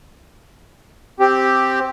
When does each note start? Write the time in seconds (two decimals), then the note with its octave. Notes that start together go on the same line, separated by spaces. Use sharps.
1.20 C4 G4